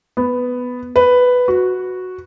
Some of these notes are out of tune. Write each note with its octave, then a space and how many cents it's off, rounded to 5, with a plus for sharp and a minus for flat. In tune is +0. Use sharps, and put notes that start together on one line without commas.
B3 +5
B4 +5
F#4 -5